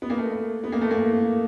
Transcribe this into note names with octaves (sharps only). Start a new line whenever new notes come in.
B3
A#3
A3
B3
A#3
A3
A#3